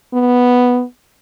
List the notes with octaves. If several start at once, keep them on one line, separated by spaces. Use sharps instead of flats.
B3